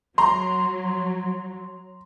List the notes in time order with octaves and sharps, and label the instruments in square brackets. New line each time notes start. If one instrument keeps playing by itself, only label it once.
[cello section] F#3 [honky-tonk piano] A#5 C6